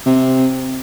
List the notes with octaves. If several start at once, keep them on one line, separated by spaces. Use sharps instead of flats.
C3